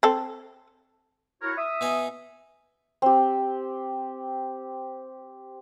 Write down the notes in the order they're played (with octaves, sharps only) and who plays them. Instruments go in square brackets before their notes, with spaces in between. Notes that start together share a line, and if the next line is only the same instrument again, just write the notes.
[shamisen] C4 A4
[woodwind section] E4 F#4 C#5 [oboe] A#4
[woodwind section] E5 [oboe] D#6
[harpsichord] B2 D#4 G#5
[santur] C4 G4